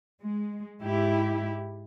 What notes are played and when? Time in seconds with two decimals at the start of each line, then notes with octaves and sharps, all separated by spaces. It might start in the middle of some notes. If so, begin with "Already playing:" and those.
0.23 G#3
0.81 G#2 E4 G4